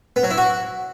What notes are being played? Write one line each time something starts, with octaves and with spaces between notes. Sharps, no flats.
B3
F#3
E4
F#4